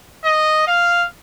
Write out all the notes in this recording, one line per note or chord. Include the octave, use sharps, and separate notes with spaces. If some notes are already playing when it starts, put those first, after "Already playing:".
D#5
F5